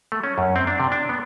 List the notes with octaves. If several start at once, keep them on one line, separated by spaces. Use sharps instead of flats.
A3
C#4
F#2
C4
D4
C3
D4
B3